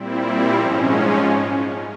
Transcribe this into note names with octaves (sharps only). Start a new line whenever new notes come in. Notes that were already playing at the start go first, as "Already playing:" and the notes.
Already playing: A#2 G3 C4 E4
G#2 F3 G#3 C#4 A#5
C6